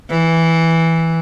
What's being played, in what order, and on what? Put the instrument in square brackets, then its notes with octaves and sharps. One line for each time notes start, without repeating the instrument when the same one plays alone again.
[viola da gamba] E3